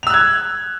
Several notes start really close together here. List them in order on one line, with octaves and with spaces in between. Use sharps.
F7 E6 F#6 G#6